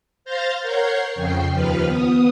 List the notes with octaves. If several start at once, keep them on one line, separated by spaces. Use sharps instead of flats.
C5 F5 F6 G6 A6 A#6
A#4 C#5 F#5 G6 G#6 C7
F2 C#3 G5 C7
D#2 F3 B4 F6
B3 D#6